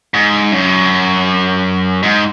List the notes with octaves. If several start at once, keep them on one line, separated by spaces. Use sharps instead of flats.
G#2
F#2
G#2